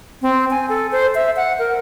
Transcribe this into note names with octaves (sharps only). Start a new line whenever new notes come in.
C4
G#5
A4
C5
E5
F#5
A#4